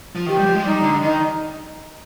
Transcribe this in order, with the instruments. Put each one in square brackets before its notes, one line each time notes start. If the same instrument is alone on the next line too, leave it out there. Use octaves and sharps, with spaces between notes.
[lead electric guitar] F3
[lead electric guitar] D#3 [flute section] G4
[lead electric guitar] G3
F3
G#3
[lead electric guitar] G3 [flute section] D#4
[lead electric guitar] D3
[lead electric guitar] D#3 [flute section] D#4